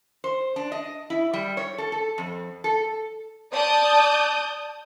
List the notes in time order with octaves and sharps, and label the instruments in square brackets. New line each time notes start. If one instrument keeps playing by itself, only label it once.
[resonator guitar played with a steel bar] C5
D4
D#5
E4
G3
C#5
A4
A4
F2
A4
[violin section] D5 A5 D#6 G6